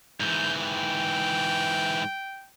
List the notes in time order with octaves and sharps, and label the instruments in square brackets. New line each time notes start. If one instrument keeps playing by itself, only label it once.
[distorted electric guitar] G#2 E3 [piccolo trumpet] G6
[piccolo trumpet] G5